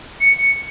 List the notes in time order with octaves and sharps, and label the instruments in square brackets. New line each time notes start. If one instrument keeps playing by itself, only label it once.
[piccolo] C#7